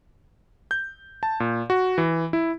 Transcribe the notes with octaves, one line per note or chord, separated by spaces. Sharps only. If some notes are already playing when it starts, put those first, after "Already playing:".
G6
A5
A#2
F#4
E3
E4